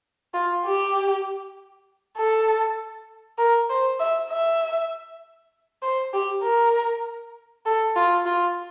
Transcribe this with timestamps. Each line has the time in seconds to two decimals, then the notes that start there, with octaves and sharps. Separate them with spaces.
0.34 F4
0.65 G4
2.17 A4
3.39 A#4
3.70 C5
4.00 E5
4.30 E5
5.83 C5
6.13 G4
6.43 A#4
7.66 A4
7.96 F4
8.26 F4